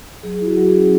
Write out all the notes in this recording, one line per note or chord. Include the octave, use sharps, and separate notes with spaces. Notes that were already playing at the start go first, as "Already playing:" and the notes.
F#3 G#4
E4 F#4
F#3
G#4
C#4